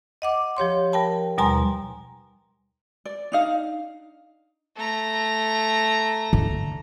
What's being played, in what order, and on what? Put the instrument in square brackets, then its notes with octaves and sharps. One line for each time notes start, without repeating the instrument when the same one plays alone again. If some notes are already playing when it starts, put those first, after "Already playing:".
[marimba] D#5 F#5 D6
F3 G4 C#5 C6
A#4 G5 A5 B5
D#2 B2 G3 G#5 A#5 C6
[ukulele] D5
D4 D#4 F5
[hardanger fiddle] A3 A#5
[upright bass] D3